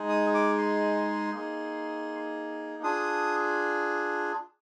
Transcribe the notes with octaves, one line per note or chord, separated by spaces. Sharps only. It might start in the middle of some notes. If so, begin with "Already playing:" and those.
Already playing: G#3 D#4 G#4
D#6
D6
C6
A#3 D#4 G#4
D4 F4 G#4 D#6